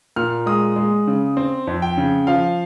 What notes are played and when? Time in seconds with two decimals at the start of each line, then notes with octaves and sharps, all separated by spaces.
0.16 A#2 F6
0.46 G#3 D#6
0.76 G#3
1.07 C#3
1.37 C4
1.67 F2
1.82 G5
1.97 C#3
2.27 F3 F5